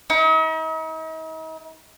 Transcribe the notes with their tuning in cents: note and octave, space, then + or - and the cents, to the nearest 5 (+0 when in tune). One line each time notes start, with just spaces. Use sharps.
D#4 +45